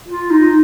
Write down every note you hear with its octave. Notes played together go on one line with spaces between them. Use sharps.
F4
D#4